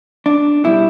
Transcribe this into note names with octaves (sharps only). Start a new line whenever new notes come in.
D4
B2 G3 E4